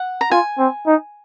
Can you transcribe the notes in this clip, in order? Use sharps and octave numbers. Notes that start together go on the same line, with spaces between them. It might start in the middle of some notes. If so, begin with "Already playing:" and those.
Already playing: F#5
A#5
F4 G#5
C4
D#4